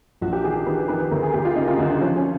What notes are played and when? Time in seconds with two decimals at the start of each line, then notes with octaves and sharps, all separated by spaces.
0.21 A#1 F#4
0.33 G4
0.44 D#3 G#4
0.66 D#3 B4
0.88 D#3 B4
1.11 D2 A#4
1.22 G#4
1.33 D2 G4
1.45 F4
1.56 C#3 D#4
1.68 F4
1.78 D2 F#4
1.90 D4
2.01 F3 C#4
2.16 C#4